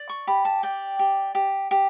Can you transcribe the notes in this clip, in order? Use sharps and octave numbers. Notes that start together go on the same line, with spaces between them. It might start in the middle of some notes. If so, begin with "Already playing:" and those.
Already playing: D5
C#6
G4 B5
A5
D5 G5
G4
G4
G4